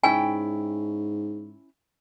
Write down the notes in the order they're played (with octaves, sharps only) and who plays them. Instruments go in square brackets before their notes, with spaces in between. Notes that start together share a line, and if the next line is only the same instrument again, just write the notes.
[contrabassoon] G#2 [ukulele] C#4 E4 G5 [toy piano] G#5